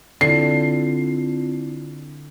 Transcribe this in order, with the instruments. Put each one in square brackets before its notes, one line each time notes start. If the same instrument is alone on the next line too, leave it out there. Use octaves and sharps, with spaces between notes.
[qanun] D3 [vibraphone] C4 E4 F4 [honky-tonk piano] C7